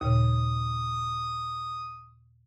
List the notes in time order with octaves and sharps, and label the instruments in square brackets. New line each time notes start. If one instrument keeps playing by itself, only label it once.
[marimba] D#2 A#2 C#3 [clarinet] D#6